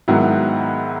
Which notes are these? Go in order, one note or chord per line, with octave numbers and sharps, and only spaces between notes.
G#2 D#3 F#3 B3 E4